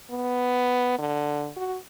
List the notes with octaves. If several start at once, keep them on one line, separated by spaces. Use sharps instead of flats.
B3
D3
F#4